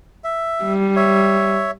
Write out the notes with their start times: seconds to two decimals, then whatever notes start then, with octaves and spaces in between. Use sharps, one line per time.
0.24 E5
0.64 G3
0.96 C#5 E5